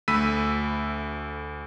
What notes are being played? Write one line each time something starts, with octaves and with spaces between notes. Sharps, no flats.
D2 A3 B5 E6 B6 D#7